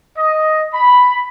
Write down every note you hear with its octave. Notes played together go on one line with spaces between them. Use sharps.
D#5
B5